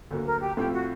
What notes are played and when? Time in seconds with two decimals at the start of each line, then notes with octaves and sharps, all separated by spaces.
0.11 D2 D3 F#3 A#3
0.26 A#4
0.41 G4
0.57 A2 F3 A3 C4 F4 G4
0.73 F#4